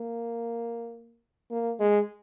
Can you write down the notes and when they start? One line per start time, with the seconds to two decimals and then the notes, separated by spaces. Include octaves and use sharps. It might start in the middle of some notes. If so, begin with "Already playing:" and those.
Already playing: A#3
1.51 A#3
1.80 G#3